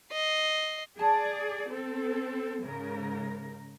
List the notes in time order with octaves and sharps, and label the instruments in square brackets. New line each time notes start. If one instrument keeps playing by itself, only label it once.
[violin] D#5 C7
[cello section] G#4 D5 [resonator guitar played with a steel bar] A5
[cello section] C4 A4
[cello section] G#2 C#3 A#4 [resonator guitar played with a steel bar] E3